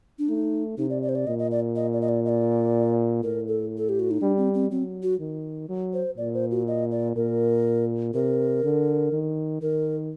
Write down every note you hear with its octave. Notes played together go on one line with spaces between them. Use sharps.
D4
A3 D#4
C3 D#4
D5
D5
C5
D5
A#2 D#5
D#5
D5
D#5
D5
D#5
D5
D#5
D5
A2 A#4
A4
A4
G4
F#4
D#4
G3 D4
C4
C4
F#3 C4
F#4
D#3
F#3
C5
A#2 D5
C5
F#4
D#5
D5
A#2 A#4
C3 A#4
D3
D#3
D#3 A#4